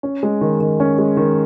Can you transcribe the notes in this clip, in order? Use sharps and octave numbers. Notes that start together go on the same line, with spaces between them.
C#4
G#3
D#3
D#3
C#4
G#3
D#3